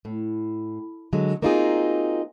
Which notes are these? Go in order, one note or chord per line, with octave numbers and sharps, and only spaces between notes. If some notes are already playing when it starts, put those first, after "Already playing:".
A2
D3 F#3 G#3
A#3 C4 D#4 F4 F#4 G#4